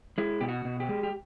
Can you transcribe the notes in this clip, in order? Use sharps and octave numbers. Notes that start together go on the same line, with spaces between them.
G#3 E4
B2 G4
F#4
B2
G4
G#3
G4